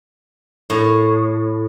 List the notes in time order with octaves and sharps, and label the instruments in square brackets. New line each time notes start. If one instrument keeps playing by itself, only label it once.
[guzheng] A2